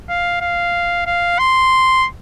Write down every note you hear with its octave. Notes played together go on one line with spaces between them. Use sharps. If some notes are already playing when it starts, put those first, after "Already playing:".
F5
F5
F5
C6